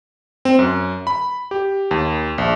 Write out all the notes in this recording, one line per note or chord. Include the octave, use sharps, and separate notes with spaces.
C4
F#2
B5
G4
D#2
A#1